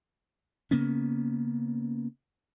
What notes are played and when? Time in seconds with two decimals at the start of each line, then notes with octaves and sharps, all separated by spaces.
0.71 C#3 A#3 B3 C#4